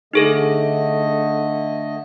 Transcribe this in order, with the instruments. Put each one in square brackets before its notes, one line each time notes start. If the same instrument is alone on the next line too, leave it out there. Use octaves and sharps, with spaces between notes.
[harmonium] D3 A3 D#5 [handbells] D#4 G#4 A4